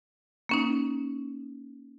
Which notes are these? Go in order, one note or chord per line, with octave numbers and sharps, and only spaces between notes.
A#3 C#4 D#4